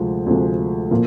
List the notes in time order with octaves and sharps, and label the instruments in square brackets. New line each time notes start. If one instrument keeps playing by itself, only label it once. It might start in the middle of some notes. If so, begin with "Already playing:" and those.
Already playing: [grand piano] D2 C3 F3 G#3
D2 C3 F3 G#3
A#2 F3 A#3